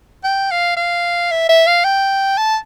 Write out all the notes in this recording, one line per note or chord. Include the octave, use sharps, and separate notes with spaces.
G5
F5
F5
E5
E5
F5
G5
A5